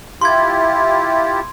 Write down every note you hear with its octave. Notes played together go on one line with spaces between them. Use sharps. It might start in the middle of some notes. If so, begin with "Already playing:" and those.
E4 F4 G4 C6 G#6